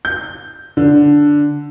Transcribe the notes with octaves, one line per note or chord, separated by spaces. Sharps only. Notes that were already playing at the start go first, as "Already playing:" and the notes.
G6
D3